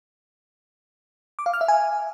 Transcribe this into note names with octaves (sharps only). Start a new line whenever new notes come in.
D6
F5
F6
E5
G#5